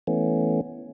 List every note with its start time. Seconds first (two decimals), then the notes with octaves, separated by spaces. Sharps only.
0.07 E3 A3 B3 C#4